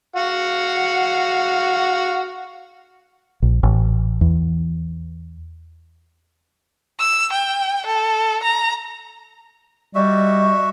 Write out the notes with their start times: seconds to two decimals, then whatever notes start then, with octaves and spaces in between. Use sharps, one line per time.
0.16 F#4 F5 F#5
3.42 A#1
3.63 A1
4.21 E2
6.99 E6
7.32 G5
7.86 A4
8.43 A#5
9.95 G3 F#4 D#5 E5